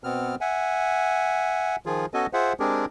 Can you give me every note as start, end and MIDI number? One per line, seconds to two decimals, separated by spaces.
0.04 0.35 47
0.04 0.35 59
0.04 0.35 60
0.04 0.35 89
0.41 1.76 76
0.41 1.76 78
0.41 1.76 80
1.86 2.06 51
1.86 2.06 53
1.86 2.06 65
1.86 2.06 68
2.14 2.27 59
2.14 2.27 61
2.14 2.27 66
2.14 2.27 69
2.14 2.27 75
2.14 2.27 80
2.33 2.53 65
2.33 2.53 68
2.33 2.53 72
2.33 2.53 76
2.33 2.53 78
2.60 2.85 56
2.60 2.85 60
2.60 2.85 62
2.60 2.85 67
2.60 2.85 68
2.60 2.85 70